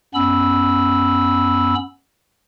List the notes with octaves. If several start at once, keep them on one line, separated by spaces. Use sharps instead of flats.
F#2 B3 C#4 B5 E6